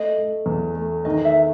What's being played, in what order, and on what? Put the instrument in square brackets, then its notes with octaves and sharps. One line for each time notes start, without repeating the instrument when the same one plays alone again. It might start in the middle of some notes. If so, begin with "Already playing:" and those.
Already playing: [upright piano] A3 [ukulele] D#5
[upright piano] A3
E2
A3
[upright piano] D#3 [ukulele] D#5
[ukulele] E5